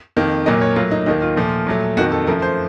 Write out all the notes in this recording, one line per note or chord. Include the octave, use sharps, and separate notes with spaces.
F2 D#3 A#3
A#2 F#3 A#3 D#5
C#5
A2 F#3 A#3 F4
D#4
D#2 D#3 A#3 D#4
F4
A#2 F3 A3
A#2 F#3 A3
F2 D#3 A#3 F#4
A4
F#2 F3 A3 A#4
C5